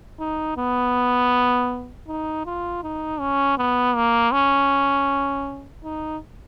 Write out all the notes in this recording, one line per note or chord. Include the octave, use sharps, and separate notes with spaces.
D#4
B3
D#4
F4
D#4
C#4
B3
A#3
C#4
D#4